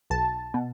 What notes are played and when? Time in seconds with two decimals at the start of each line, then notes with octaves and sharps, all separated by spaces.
0.10 B1 A5
0.54 B2